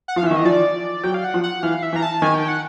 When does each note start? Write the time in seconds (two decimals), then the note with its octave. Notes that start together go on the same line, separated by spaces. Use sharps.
0.08 F#5
0.16 F3 F5
0.23 E3
0.27 D#3 E5
0.36 E3 D#5
0.45 F3 D5
1.04 F#3 G5
1.14 F5
1.24 F#5
1.34 F3
1.43 F#5
1.63 E3 F5
1.83 E5
1.93 E3 A#5
2.02 A5
2.22 D#3 G#5
2.34 G5
2.48 F#5